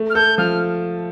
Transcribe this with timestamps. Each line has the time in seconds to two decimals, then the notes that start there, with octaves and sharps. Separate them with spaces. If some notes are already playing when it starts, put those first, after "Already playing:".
Already playing: A3
0.10 F6
0.15 A4 G6
0.38 F3 F6